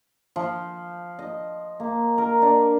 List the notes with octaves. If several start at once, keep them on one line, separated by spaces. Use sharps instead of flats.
F3
D#5
A#3
A#4
D4